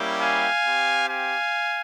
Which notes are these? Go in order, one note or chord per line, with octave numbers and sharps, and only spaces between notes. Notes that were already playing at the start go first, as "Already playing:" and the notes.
Already playing: G3 A#3 C#4 E4 G4
F5 G#5
C4 G4
F5 G#5